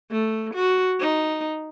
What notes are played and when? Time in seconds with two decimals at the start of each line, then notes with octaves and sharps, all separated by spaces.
0.11 A3
0.54 F#4
1.00 D#4